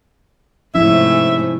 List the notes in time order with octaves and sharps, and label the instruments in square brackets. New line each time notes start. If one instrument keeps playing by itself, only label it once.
[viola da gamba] G#2 C3 A3 [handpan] F3 C#4 E4 [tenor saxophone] E5